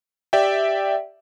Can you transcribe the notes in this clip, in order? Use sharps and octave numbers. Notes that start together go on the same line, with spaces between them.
G4 D5 E5 G5